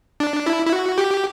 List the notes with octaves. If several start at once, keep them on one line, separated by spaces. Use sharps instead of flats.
D4
E4
E4
F#4
G4